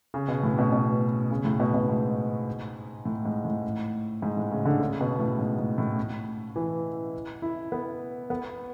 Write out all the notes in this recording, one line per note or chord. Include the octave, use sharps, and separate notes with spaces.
C#3
B2
A2
B2
B2
C#3
A2
B2
B2
G#2
A2
G#2
A2
G#2
A2
C#3
D3
C#3
B2
A2
G#2
G#2
A2
E3
E4
B3
B3